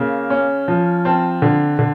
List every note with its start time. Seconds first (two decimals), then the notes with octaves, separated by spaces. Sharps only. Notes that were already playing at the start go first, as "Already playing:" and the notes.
Already playing: C#3 A#3
0.30 C#4
0.68 F3
1.05 C4 A5
1.42 D3
1.79 D3